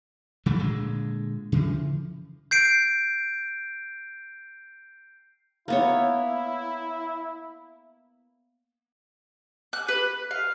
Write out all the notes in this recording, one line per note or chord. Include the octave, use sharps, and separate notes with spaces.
C#3 F#3 A3
A#2 D3 G#3
C#3 E3 F3
G6 C7 D7
A#3 B3 E4 C#5
F#6
B4
F5